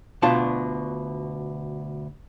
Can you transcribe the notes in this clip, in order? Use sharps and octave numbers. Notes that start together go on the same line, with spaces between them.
D2 B2 D4 F4 A5